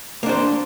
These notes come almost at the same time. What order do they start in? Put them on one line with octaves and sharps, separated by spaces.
A#3 D4 C5